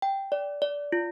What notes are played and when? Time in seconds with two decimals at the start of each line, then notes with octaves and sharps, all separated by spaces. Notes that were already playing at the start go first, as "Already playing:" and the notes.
0.02 G5
0.32 D5
0.62 D5
0.92 F4